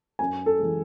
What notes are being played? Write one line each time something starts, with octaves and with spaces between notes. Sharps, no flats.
F#2 G#5
A4
E3 G#3